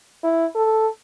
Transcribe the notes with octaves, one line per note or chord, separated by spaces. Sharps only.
E4
A4